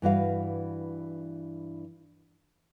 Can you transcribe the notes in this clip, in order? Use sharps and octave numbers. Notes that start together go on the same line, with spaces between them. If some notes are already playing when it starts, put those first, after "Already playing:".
G2 E3 F#4 F5